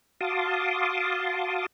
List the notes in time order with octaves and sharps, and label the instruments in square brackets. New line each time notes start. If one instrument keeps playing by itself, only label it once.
[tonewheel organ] F#4 F5 A5 C6 D6 D#6